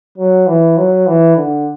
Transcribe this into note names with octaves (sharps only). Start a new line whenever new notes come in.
F#3
E3
F#3
E3
D3